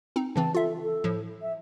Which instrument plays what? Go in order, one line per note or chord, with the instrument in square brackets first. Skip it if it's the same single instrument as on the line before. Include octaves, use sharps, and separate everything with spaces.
[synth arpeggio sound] C4 D#4
[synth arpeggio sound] C#3 E3 C4 [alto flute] A5
[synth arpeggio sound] F4 E5 [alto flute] A4
[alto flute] A4
[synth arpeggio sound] A2 F3
[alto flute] E5